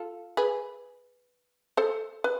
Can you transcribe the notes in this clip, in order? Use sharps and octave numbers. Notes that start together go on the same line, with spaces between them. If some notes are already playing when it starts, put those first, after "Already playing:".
Already playing: F4 A4
G#4 B4
A4 C5
B4